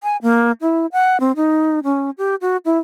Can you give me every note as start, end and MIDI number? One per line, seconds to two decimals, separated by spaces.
0.03 0.17 80
0.22 0.52 58
0.61 0.86 64
0.92 1.20 78
1.20 1.32 60
1.36 1.80 63
1.84 2.10 61
2.18 2.35 67
2.41 2.57 66
2.65 2.78 64